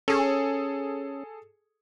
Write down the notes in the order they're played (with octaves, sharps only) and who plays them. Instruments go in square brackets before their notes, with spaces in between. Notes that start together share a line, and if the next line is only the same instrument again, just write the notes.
[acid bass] C#4 [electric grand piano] G#4 A4